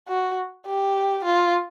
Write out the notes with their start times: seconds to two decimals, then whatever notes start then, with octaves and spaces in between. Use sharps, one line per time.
0.08 F#4
0.66 G4
1.25 F4